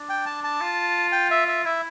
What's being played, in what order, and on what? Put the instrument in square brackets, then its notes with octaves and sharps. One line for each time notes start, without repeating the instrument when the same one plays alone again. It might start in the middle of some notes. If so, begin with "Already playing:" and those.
Already playing: [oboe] D4
[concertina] G5
A5
A5
[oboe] F4
[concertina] G5
E5
E5
[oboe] E4 [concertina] E5